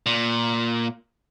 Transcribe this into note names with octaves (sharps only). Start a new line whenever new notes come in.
A#2